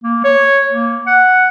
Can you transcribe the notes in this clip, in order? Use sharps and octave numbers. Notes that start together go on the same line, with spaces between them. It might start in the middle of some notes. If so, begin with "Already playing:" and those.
A#3
C#5
A#3
F#5